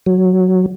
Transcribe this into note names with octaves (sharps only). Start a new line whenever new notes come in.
F#3